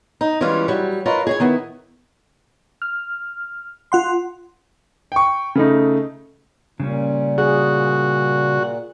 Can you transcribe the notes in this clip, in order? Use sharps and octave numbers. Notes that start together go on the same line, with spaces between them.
D#4
E3 G3 G#3 C#4 F4
F#3 G3
F4 A#4 B4 C#5 D#5
G#4 C#5 G#5
D#3 B3 E4
F6
F4 F#5 C6
G5 C#6
C#3 A3 D#4
A#2 C#3 G3 C#4
F#4 G#4